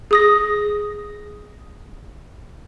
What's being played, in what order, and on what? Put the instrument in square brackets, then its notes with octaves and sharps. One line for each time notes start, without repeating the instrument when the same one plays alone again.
[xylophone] G#4 D#6 A#6